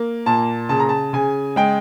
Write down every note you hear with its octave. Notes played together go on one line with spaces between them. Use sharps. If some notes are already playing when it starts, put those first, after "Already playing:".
Already playing: A#3
A#2 A5
C#3 A5
A#5
A5
C#3 G#5
G#3 G5